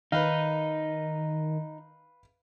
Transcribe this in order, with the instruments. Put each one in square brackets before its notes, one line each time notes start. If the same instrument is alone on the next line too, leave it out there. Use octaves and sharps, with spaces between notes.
[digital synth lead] D#3 [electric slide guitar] D#4 [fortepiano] B4 F5